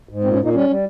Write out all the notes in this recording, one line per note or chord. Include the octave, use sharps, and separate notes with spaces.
G#2
A#2 C4
C#4
A#2
D#4
G3 C#4
G3